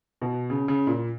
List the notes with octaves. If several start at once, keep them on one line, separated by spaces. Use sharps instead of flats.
B2
C#3
C#3
A#2